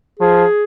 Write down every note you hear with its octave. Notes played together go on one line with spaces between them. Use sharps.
F3 G#4